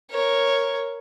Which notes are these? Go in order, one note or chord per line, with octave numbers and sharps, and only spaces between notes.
A#4 C#5